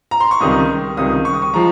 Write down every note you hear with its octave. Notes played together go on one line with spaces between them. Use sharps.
A#5
C6
C#6
C#2 C3 D#3 G3 D#6
C#2 C3 D#3 G3 D#6
C#6
D#6
C#6
F3 G#3 A#5